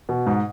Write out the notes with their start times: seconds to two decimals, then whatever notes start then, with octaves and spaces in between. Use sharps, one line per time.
0.09 B2
0.26 G#2